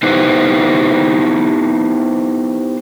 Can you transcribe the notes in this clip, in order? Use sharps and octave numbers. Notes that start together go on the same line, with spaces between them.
B3 D#4 E4 G4 B4 C5